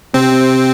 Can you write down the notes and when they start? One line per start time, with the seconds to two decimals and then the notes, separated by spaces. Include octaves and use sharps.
0.14 C3 C4